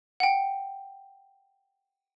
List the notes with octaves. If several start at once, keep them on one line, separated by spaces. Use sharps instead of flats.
F#5 G5